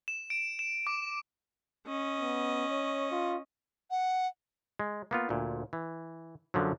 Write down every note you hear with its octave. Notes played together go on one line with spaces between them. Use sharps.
E7
D7
E7
D6
C#4 D#5
B3
C#5
F4
F#5
G#3
A#3 B3 F4
D2 A#2
E3
F#2 D3 F3 F#3